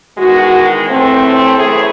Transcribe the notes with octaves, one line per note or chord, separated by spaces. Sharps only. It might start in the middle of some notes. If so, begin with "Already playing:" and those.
E2 D#3 G#3 F#4
A2 E3 A3 C4
F#2 E3 A3 G#4